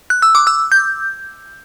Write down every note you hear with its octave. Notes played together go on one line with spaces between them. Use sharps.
F#6
E6
D6
E6
G6